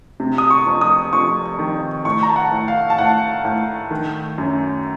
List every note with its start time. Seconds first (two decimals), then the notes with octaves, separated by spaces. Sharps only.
0.20 C3
0.38 D#6
0.50 C#6
0.66 F2
0.81 D#6
1.13 F2 C#6
1.59 D#3
2.05 A2 C#6
2.23 A#5
2.29 A5
2.36 F#5
2.51 A2
2.68 F5
2.90 A5
2.98 A2 F#5
3.45 A2
3.91 D#3
4.38 F#2